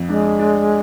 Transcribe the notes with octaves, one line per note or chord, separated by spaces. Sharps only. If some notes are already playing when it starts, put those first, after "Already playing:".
Already playing: F2
G#3 D4
D4